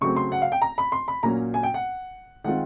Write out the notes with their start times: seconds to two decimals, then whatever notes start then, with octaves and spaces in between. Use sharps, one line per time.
0.01 C#3 F#3 A3 C4 C#6
0.16 C6
0.32 F#5
0.42 F5
0.52 G5
0.62 A#5
0.78 B5
0.92 C6
1.08 B5
1.23 A#2 F#3 A#3 C#4 A#5
1.54 G#5
1.63 G5
1.74 F#5
2.44 D#3 G#3 C4 F4 F#5